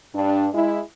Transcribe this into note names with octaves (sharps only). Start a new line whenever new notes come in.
G2 D4
G#3 E4